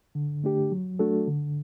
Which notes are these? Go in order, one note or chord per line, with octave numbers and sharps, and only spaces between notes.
D3
A3 D4 G4
F#3
A3 D4 F#4 A4
D3